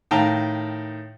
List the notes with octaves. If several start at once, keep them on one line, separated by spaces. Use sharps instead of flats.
A2 D#3 F5 G5 A5 A#5